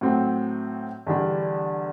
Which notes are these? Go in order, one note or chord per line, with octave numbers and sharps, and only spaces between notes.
A2 F#3 C4
E2 D3 G3 D4